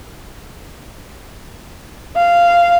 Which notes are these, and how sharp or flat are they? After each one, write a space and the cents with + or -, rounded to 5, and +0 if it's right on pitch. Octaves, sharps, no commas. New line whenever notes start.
F5 -10